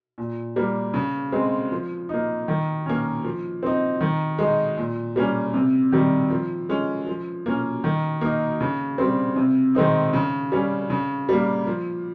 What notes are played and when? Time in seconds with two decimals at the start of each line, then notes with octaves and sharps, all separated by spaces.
0.18 A#2
0.56 G3 A#3
0.94 C#3
1.32 G#3 C4
1.71 F3
2.09 A#3 D#4
2.48 D#3
2.86 A#3 C#4
3.24 F3
3.63 C4 D#4
4.01 D#3
4.39 G#3 D#4
4.77 A#2
5.16 G3 A#3 C#4
5.54 C3
5.92 D#3 G3
6.30 F3
6.69 G#3 C#4
7.06 F3
7.46 A#3 C#4
7.84 D#3
8.21 A#3 D#4
8.61 C#3
8.98 G3 C4
9.36 C3
9.75 D#3 G#3 C4 D#4
10.13 C#3
10.52 G3 C#4
10.90 C#3
11.29 G3 A#3
11.67 F3